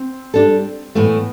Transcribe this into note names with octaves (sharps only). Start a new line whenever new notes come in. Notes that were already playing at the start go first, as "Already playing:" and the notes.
Already playing: C4
G3 D4 A4
A2 E3 A3 B3